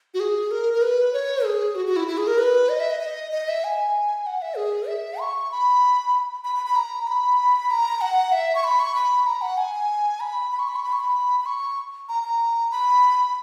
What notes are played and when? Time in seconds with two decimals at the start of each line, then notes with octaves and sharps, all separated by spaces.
0.14 F#4
0.20 G#4
0.51 A#4
0.74 A#4
0.82 B4
1.13 C#5
1.45 G#4
1.75 F#4
1.86 F#4
1.96 E4
2.08 E4
2.18 G#4
2.27 A#4
2.38 B4
2.69 D#5
2.80 E5
2.90 D#5
3.00 D#5
3.32 D#5
3.48 E5
3.64 G#5
4.27 F#5
4.42 E5
4.57 G#4
4.88 E5
5.20 C#6
5.51 B5
6.44 B5
6.56 B5
6.66 B5
6.76 A#5
7.07 B5
7.71 A#5
8.01 F#5
8.32 E5
8.55 C#6
8.64 B5
8.79 C#6
8.95 B5
9.27 A#5
9.42 F#5
9.57 G#5
10.20 B5
10.52 B5
10.59 C#6
10.68 B5
10.76 C#6
10.83 B5
10.93 C#6
11.00 B5
11.40 B5
11.46 C#6
12.09 A#5
12.23 A#5
12.71 B5